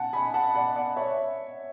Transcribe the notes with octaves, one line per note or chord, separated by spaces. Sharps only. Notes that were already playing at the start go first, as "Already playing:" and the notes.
Already playing: F#5 G#5 A5
G#5 B5
F#5 A5
D5 F#5
D5 F#5
C#5 E5